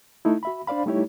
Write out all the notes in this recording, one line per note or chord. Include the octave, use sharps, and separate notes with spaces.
A3 D#4 E4
F#4 E5 B5
D4 C5 D5 F5 B5
G3 A3 D#4 E4 G4 C#5